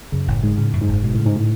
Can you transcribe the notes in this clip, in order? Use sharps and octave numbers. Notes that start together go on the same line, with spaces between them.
F#2 C#3
F#1 A2
G#2 G#3
A2 C#3
F#2
G#2
F#1
B2 G#3
A2 C#3
G#2
A2